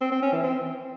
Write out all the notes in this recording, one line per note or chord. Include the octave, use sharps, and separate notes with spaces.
C4
C4
C#4
E3
C4